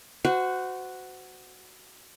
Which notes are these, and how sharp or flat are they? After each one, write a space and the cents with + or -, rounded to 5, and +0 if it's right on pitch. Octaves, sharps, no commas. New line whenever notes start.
F#4 +0 C5 -30 F#5 +0